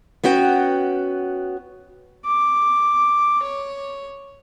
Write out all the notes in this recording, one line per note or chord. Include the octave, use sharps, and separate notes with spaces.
B3 C#4 F#4 G5
D6
C#5